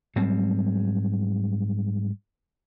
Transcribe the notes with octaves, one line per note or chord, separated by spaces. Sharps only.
G#2 F#3 G3 C4